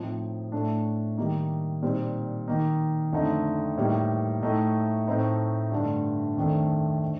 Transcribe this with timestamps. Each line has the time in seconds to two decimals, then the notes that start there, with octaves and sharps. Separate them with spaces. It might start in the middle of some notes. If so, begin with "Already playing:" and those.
Already playing: A2 F3 C4 D#4
0.52 A2 A3 D4
1.17 D#3 G3 A#3 D#4
1.82 A#2 G3 C4 D#4
2.48 D#3 A#3 D#4
3.13 F2 D3 A3 D#4
3.77 A2 G3 A#3 D#4
4.43 A2 A3 D#4
5.07 A2 A3 C4 D#4
5.72 G2 D3 A3 D4
6.37 F2 D#3 A3 D4
7.03 D3